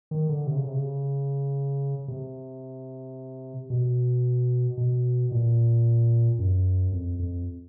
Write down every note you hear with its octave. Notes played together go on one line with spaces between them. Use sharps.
D#3
D3
C3
C#3
C3
C#3
C3
B2
B2
A#2
F#2
F2
F2